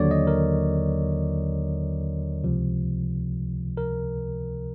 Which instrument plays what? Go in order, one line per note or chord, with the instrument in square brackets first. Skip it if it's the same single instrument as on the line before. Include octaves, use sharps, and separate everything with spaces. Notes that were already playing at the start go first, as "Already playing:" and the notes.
Already playing: [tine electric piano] D#2 D3 F#3 C#5 D5
D#5
A#4
C#2 C3 F3
A#4